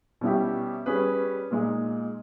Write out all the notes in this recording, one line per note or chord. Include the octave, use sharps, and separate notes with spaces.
B2 G3 C#4 E4 G4
G3 C#4 G#4 B4
A#2 G#3 D#4